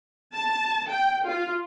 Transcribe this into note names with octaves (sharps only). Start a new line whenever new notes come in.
A5
G5
F4